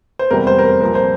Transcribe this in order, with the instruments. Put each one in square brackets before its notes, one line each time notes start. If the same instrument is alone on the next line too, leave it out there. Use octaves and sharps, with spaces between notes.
[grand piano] C5
F1 E2 C3 G3 A#4
C5
A#4
C5
C2 A#2 F3 A#4
C5